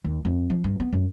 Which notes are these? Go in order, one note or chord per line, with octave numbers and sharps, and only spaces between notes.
D#2
F2
F3
G2
B3
F#2